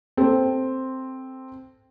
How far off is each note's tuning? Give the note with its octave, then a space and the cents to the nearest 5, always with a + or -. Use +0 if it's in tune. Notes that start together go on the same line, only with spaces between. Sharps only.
C4 +0 A4 +0